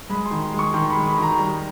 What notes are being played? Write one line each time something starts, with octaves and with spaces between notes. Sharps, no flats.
G#3 B5
C6
D#3
C6
G#3
C#6
D#3 C6
B5
G#3
B5
D#3 A#5
G3